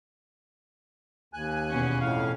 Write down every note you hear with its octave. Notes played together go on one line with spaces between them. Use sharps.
D#2 G#5 F#6
E2 B2 C#4
F2 A2 F5